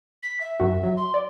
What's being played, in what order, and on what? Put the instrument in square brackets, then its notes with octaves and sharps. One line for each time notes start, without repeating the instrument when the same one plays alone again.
[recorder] B6
E5
[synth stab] F#2 F#4
F#3
[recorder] C6
[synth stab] D5